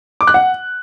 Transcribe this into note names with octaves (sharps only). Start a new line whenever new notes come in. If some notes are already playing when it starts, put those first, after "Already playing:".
D6
F#6
F#5